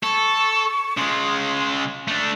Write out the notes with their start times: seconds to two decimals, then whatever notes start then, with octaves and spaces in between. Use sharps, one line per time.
0.03 A4 C#6
0.97 C#3 G#3 C6
2.08 A3 D4